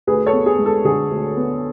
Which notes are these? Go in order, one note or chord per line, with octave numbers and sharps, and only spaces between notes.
D2 G#4 B4
A4 C#5
B3
G#4
G#3
A4
D3 G#4
D2
B3